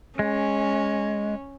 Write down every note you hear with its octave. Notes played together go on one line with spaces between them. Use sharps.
G#3 C#4